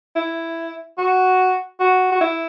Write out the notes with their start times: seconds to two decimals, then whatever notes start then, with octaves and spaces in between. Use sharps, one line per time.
0.16 E4
0.98 F#4
1.80 F#4
2.12 F#4
2.21 E4